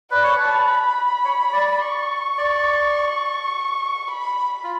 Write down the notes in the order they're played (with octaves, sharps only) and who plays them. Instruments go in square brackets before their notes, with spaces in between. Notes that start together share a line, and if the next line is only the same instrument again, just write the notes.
[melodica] B4 [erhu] D5
[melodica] C#5
[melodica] B4 [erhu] A5
[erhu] B5
[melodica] C#5
D5
[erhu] C#6
[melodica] D5
[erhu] B5
[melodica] F4